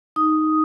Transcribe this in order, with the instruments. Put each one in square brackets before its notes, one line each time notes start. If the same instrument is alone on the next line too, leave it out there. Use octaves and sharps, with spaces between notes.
[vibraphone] D#4 D#6